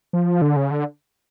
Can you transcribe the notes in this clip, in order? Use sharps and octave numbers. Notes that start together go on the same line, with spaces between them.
F3
D3
C#3
D3